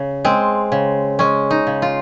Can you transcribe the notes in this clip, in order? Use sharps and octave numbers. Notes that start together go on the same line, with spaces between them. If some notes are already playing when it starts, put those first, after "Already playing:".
Already playing: C#3
G#3 C4
C#3
G#3 C#4
D#4
C#3
F4